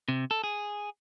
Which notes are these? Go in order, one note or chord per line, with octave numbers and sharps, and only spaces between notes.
C3
A4
G#4